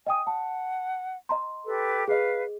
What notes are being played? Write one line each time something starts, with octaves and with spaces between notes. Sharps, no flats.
D#5 G5 G#5 D#6
F#5 A5
D#5 A#5 C6
G4 A4 B4
G#4 B4 D#5 F5